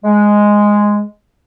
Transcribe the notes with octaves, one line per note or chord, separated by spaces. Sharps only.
G#3